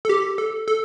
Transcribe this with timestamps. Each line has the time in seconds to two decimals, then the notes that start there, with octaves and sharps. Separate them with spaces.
0.05 A4
0.09 G4
0.38 A4
0.68 A4